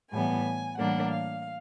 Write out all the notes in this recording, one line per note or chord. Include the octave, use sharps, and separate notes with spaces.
A2 E3 G3 B3 G#5
A2 E3 G3 A#3 D4 F#5
F5